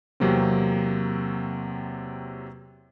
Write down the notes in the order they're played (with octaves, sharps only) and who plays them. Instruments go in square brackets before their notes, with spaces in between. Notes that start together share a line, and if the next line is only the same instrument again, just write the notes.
[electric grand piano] E2 C3 F#3 A#3 C4